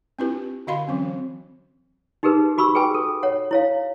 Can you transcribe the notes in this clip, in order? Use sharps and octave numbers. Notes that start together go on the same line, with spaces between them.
C4 D4 E4 F4 G4 B4
D3 F#4 D#5 F5 B5 C6
E3 F#3 C4 C#4
D#4 G4 G#4 A#4 B4
F#4 B5 C#6 E6
G#4 B4 G5 G#5
A4
C#5 F#5
E4 C#5 F5